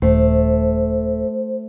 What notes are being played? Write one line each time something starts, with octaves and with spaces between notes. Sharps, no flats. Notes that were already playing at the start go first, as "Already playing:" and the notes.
D#1 A3 C5